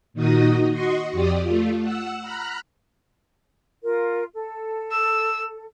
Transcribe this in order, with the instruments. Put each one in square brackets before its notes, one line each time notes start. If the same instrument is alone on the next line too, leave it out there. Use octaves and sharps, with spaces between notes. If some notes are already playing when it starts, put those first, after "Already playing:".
[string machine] A#2 D#3 D#4 F#4 D#5 D#6
F#4 D#5 C6 C#6
F2 G4 D5 D#6
A3 F4
F#5 E6
A#5 B5 F6 F#6
[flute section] F4 A#4
A4
[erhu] E6